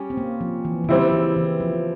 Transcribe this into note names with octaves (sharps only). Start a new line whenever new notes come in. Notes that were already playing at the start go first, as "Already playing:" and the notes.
Already playing: G3 C#4
C4
A#3
F3
E3
E3
C#3 G3 C4 E4
E3
E3
F3